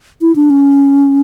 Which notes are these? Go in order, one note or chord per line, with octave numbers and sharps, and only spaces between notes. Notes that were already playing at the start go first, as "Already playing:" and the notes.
E4
D4
C#4